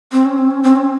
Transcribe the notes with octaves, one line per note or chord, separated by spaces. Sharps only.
C4
C#4
C4
C#4
C4
C#4